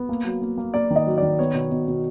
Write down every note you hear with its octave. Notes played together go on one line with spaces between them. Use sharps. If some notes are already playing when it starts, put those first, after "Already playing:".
Already playing: B3
A#3
F#3
A#3
A#3
A#3 D5
D#3
D#5
F#3
D#3 D5
B3 C#5
B2
B2
B2